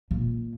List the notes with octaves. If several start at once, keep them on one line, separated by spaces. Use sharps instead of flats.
A#2